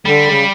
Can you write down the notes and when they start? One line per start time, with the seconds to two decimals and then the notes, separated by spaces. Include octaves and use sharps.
0.06 D3 G3
0.27 C#3